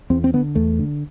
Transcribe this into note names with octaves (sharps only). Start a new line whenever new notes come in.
E2 C4
C4
D3 B3
E2 A3
D3